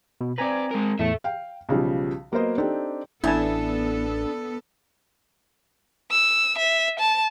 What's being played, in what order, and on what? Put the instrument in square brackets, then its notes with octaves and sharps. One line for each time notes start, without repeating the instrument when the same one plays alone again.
[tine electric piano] B2
[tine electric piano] C4 G#5 A#5 [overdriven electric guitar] B4 D5
[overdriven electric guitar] G#3 A#4
[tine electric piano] E2 A2 [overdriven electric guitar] A4 E5
[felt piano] F5 G5
B1 C#3 F3 G3
F#3 A#3 B3 A#4 C5 D#5
C4 D4 D#4 G4 A4
[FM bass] A1 [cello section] B3 A4 [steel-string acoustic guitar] D4 [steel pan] E4 G#5 A5
[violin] E6
E5
A5